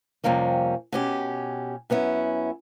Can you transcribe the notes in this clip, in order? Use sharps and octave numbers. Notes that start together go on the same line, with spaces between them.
F2 C3 G3 A#3 C#4
B2 C#4 G4
F#2 B3 C#4 E4